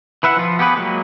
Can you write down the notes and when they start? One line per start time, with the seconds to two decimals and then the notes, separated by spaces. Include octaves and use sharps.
0.23 E3 B4 E5 F#5
0.37 F3 F4
0.59 B3 G4 G#4 B4
0.76 F#3 G#3 A#3